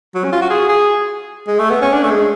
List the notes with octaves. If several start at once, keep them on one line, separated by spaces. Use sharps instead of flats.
F#3
C#4
F4
F#4
G#4
G#4
G#3
A3
B3
C#4
D4
A3
G#3